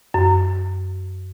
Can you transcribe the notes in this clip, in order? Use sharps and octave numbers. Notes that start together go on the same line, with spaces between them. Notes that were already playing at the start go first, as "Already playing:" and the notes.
F#2